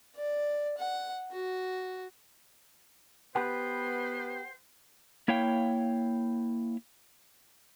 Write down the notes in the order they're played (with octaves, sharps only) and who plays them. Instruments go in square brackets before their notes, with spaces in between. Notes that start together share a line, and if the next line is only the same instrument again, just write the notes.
[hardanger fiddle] D5
F#5
F#4
[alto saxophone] B3 [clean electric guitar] G4 B4 F#5 [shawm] C5
[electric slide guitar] A#3 E4 C#5 F5 G5